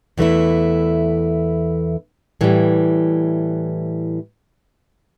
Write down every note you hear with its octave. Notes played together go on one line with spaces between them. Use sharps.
E2 E3 A3 E4
A2 E3 G3